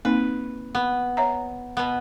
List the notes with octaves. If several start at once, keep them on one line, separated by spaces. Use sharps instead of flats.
A#3 C4 D#4 B4
B3
C#5 E5 A#5
B2 B3